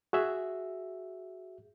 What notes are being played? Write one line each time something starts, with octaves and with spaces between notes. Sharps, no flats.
F#4 G#4 E5